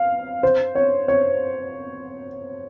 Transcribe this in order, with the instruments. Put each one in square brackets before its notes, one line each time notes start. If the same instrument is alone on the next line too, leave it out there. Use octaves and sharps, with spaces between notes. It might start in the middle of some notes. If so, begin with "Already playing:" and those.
Already playing: [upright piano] F5
C5
C#5
C#5